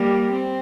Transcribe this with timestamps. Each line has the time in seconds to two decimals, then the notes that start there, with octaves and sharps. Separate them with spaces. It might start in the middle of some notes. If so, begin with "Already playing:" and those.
Already playing: G3 A#3
0.31 C4